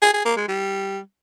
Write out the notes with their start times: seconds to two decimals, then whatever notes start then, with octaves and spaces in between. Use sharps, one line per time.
0.02 G#4
0.14 G#4
0.25 A#3
0.37 G#3
0.48 G3